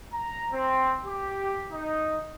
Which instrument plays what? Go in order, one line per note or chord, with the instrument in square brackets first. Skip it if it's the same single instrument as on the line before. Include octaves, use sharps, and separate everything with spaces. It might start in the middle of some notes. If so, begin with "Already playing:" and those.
[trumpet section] A#5
C4
G4
D#4